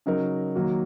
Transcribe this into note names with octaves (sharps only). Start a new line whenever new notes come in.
C#3 F#3 D#4 A#4
D#3 F#3 A#3 F#4